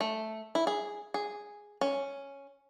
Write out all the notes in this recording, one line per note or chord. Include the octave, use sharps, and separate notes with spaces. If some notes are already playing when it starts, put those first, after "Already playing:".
A3
E4
G#4
G#4
C#4